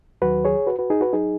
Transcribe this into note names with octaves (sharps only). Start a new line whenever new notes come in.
D#2 D#3 F#3 F#4 B4
G#4 C#5
F#4 B4
F#4 B4
D#4 G#4
F#4 B4
F#3 D#4 G#4